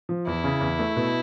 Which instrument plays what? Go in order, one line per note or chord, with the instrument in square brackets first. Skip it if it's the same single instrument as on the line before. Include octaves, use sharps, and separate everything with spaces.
[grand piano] F3
[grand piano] E2 [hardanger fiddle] E4
[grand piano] C#3
E2
A3
B2